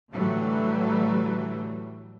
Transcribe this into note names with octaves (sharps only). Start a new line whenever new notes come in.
A2 D3 E3 F#3 G3 A3